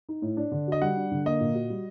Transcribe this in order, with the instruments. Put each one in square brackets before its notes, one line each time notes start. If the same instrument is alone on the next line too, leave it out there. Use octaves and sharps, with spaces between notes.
[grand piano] D#4
A2
D4
D3
[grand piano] F#4 [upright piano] D#5
[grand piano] G3 [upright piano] F#5
[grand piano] D4
D3
[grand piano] A#3 [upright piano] D#5
[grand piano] A#2
F#4
G3